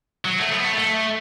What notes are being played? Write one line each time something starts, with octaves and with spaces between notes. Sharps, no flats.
F#3
A3
B3
A3
A3